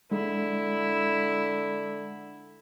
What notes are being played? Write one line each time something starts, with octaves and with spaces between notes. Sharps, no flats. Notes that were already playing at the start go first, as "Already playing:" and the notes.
D3 G#3 E4